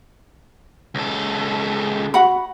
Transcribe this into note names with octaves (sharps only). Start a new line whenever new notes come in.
C#2 A4
F#4 F#5 B5